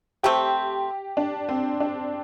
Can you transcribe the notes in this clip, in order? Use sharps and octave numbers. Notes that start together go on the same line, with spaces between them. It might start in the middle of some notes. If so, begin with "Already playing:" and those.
C3 A3 C4 G4
D4
C4
D4